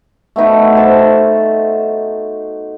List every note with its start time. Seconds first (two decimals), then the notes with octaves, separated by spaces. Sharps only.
0.36 A3 B3 D#4 F#4
0.77 C5 A5